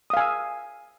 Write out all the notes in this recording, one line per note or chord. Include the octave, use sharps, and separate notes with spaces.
F5 G#5 D#6 E6